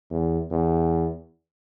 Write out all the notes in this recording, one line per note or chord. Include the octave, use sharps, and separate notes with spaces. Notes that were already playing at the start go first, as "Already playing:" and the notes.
E2
E2